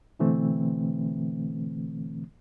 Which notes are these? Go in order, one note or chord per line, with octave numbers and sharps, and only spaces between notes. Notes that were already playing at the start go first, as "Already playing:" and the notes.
B2 D3 E3 A3 C4